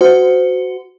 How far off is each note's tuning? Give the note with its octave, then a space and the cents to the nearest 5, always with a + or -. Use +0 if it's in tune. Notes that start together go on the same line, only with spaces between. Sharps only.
F#4 +0 C5 -30